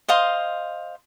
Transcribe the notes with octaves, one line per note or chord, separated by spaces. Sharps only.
C5 D#5 F5 C6